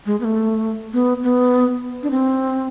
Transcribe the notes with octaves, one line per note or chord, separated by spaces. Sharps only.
G#3
B3
A3
B3
B3
D4
C4